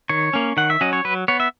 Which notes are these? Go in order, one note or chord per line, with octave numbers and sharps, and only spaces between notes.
D#3 C#5
A#3 C#4
D#3 F#5
E5
F#3 C#4 D#5
C#5
F#3 B4
B3 C#5
E5